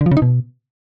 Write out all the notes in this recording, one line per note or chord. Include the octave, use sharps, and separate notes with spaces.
D3
F3
C#3
D#4
B2